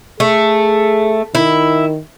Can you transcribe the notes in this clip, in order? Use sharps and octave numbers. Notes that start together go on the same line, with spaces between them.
A3 G#4
D#3 E4